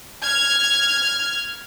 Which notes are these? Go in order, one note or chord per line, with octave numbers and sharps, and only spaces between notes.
F6 G#6